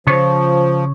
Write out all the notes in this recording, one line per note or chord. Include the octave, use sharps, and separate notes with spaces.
C#3 F3 C#5